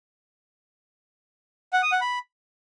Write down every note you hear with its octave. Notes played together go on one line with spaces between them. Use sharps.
F#5
D#6
F#5
B5